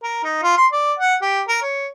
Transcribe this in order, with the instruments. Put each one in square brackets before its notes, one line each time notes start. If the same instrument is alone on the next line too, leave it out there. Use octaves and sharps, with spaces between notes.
[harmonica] A#4
D#4
F4
C6
D5
F#5
G4
A#4
C#5